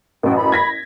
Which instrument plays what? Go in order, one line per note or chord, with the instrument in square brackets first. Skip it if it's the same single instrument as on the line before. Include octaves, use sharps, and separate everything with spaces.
[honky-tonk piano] A1 F#2 [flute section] F#4 G5
[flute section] B5
[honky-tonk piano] G#6 A#6 B6